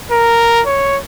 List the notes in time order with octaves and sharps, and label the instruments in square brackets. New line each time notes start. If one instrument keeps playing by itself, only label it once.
[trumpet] A#4
C#5